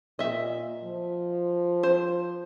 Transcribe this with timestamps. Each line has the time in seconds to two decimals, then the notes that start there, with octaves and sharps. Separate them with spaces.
0.19 A#2 D#5 E5
0.84 F3
1.83 C5